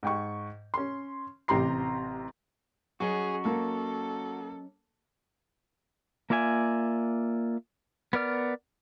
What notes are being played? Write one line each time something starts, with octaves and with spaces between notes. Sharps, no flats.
G#2 G5 C#6
C#4 C6
A1 C3 G4 A#5 C6 C7
F#3 C#4 F#4 G#4 D#5
A#3 A4
A#3 F4 D5 E5 G#5
B3 A#4 D5 F6